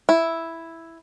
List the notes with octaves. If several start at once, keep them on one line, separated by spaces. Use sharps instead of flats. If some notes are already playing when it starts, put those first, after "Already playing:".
E4